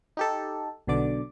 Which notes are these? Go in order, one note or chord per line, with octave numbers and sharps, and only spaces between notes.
D#4 G4 A4
B1 B2 D3 D5 D6